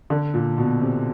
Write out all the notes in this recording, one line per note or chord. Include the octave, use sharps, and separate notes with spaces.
D3
A#2
B2
C3